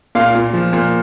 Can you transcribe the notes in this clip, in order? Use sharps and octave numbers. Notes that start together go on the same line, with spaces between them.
A#2 F5
A#2
F3
A#2